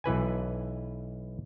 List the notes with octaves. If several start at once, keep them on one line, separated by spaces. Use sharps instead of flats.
B1 E3 B4 G#5